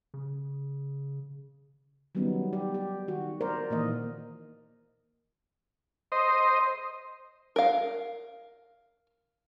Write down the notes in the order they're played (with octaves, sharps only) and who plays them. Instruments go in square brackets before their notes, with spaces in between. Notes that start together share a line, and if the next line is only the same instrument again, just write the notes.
[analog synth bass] C#3
[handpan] D#3 F#3 G3 B3 C#4 D#4
G4 D5
G4
D#3 F#4
A#4 C5 D5
A#2 D#3 E3 A#3 D#5
[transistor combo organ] C5 D#5
[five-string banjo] A#4 F5